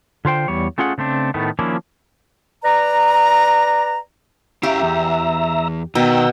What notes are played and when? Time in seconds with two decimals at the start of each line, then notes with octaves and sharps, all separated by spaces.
0.25 D3 F4 C5 G5
0.48 E2 G3 C#5
0.78 A3 C#4 F4 G#4 F#5
0.98 C#3 A3 C4 D4
1.34 A2 D#3 A3 B3
1.59 D#3 F3 A#3 C#4 D4 E4
2.64 B4 D5 A#5
4.63 C#4 E4 G4 E5 F5 A#5
4.83 E2
5.95 B2 D#3 G5 A#5 E6